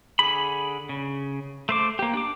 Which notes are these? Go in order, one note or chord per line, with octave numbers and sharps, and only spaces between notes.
D3 G#4 B5
C#3
A3 C5 D6
A#3 G4
D4 D6